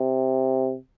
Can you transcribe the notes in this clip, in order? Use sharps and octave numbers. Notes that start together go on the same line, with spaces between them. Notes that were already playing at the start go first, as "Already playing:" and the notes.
Already playing: C3